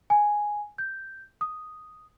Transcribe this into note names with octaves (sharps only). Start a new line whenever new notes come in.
G#5
G6
D#6